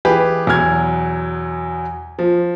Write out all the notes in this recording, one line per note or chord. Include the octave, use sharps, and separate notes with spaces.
E3 G4 G#4 B4
E2 B2 F#3 F6 G#6
F3